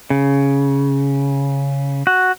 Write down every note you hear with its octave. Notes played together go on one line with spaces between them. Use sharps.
C#3
F#4